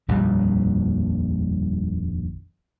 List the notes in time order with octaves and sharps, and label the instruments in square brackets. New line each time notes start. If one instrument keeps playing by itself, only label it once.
[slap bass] D#1 A#1 F2 G3